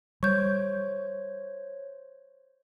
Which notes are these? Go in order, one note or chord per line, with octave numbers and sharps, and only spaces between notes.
G3 C5 C#5 C#6 G6